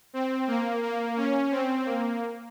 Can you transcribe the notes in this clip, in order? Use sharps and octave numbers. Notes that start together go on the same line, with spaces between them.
C4
A#3
A#3
C#4
C4
A#3